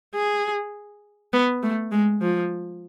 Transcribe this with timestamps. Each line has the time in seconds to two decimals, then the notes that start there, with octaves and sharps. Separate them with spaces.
0.15 G#4
1.33 B3
1.63 A3
1.92 G#3
2.21 F3